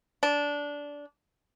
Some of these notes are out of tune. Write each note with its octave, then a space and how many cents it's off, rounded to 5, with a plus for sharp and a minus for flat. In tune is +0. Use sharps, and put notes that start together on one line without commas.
D4 -15